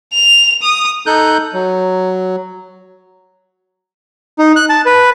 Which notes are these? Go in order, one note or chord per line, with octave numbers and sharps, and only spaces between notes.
F7
D#6
D#4 A4 F#6 G6
F#3
D#4
F#6
A5
B4